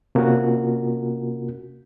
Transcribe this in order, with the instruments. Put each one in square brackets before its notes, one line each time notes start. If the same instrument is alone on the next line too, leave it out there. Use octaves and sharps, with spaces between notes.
[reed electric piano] C3 A#3 C#4 F4 F#4 A#4